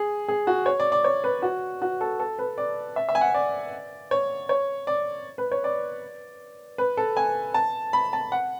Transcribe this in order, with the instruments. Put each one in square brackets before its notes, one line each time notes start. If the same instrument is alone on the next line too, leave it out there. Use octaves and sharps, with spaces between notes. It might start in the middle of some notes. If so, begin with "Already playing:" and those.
Already playing: [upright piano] G#4
G#4
F#4
C#5
D5
D5
C#5
B4
F#4
F#4
A4
A4
B4
D5
E5
E5
G#5
F#5
D5
C#5
C#5
D5
B4
C#5
D5
B4
A4
G#5
A5
B5
A5
F#5